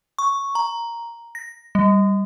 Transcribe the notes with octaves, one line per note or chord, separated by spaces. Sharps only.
C#6
A#5
A#6
G3